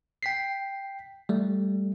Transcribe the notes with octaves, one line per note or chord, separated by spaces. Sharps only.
G5 B6 C7
G3 A3